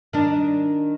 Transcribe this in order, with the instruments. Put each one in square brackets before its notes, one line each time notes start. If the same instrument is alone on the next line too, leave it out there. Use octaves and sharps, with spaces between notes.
[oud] D#3 D4